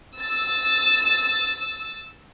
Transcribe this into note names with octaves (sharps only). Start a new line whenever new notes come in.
E6 A6